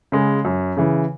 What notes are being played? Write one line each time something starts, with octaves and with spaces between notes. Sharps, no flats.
C#3 G#3
F#2
C#3 E3